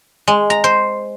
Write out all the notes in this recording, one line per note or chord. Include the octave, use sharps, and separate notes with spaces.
G#3
A#5
C5